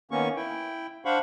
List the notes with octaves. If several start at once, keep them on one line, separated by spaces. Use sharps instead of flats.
D#3 A#3 B3 C#4 C#6
E4 G5
D4 C5 F5 F#5 B5 C#6